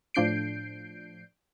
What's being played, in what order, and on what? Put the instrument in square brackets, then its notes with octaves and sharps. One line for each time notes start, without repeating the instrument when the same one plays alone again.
[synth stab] A2 F3 D4 G6 C7 D7